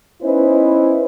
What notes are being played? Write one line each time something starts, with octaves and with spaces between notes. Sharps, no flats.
B3 C#4 D#4 E4 B4 C5